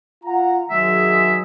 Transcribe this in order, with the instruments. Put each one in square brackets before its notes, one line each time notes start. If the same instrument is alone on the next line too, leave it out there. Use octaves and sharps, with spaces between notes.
[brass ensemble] F4 F#5 A#5
[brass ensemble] D#3 F#3 G#3 [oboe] E5